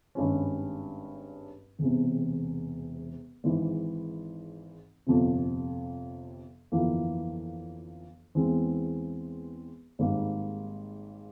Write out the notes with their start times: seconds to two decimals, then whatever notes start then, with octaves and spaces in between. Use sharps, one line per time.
0.15 G#1 G2 G3 C#4
1.79 E1 E2 C3
3.44 G#1 G#2 E3
5.07 G1 F2 C3
6.72 G1 F2 E3 A#3
8.35 E2 E3 G#3 C4
9.99 G#1 G#2 G3 A#3